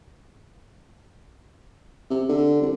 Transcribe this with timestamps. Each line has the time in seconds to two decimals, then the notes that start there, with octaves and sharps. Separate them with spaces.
2.10 C3
2.29 D3
2.61 C2